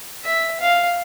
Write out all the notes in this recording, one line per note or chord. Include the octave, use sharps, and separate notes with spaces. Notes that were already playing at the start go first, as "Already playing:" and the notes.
E5
F5